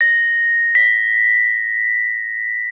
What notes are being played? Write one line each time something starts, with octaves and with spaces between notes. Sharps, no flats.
A#6
B6